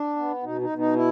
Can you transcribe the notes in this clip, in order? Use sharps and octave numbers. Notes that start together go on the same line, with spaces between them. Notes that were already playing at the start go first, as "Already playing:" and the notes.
Already playing: D4
B3
B2 D#4
D#4
B2
D#4
E4